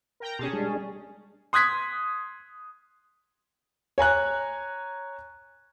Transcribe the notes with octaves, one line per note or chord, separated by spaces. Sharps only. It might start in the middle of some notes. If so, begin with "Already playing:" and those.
A#4 G5 A#5
B2 C#4 G4 G#4 A5 C6
G3 G#3 D4
C6 D#6 F#6 G#6 B6
C#5 G#5 A#5 F#6